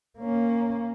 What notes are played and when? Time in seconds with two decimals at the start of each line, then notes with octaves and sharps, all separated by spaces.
0.19 A#3 C#4